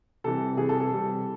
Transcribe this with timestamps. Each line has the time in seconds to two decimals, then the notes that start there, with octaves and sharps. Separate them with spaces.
0.24 C3 E3 G3 A4
0.57 C3 E3 G3 G#4
0.69 A4
0.80 A4
0.90 C3 E3 G3